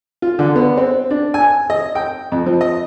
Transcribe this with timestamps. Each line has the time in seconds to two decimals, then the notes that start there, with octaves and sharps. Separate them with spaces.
0.22 F4
0.39 D3
0.56 B3
0.78 C4
1.11 D4
1.34 G#5
1.70 D#5
1.95 G5
2.32 F2
2.46 F3
2.61 D#5